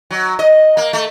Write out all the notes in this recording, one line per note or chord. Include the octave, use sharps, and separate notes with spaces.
F#3
D#5
A#3
A3